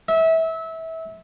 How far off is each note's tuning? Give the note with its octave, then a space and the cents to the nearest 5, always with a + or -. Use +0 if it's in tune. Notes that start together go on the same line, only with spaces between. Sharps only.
E5 -25